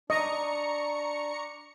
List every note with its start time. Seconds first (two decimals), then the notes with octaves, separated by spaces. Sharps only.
0.10 D4 D#5 A#5 C#6 C#7